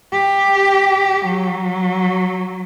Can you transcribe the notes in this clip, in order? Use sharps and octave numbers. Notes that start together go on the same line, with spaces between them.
G4
F#3